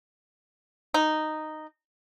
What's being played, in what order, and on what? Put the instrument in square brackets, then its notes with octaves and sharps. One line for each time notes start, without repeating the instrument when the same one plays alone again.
[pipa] D#4